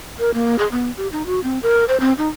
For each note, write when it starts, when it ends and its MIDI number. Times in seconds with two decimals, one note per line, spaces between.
0.20 0.33 70
0.34 0.56 58
0.59 0.67 68
0.72 0.91 59
0.97 1.08 67
1.12 1.25 63
1.26 1.42 66
1.44 1.59 60
1.63 1.85 70
1.88 1.99 72
2.00 2.13 60
2.18 2.28 63